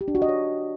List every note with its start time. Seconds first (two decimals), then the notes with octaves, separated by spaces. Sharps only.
0.01 G4
0.08 D4
0.15 F#4
0.22 D#5
0.29 C#5